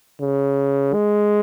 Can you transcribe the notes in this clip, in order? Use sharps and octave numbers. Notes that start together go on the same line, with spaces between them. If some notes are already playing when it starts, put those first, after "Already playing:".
C#3
G#3